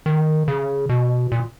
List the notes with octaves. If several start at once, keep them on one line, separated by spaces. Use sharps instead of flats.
D#3
C#3
B2
A#2